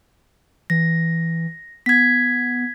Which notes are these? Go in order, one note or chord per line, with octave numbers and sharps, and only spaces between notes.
E3 A#6
B3 G#6 B6